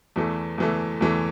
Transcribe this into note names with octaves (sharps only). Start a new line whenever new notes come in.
E2 E3 A3
E2 E3 A3
E2 E3 A3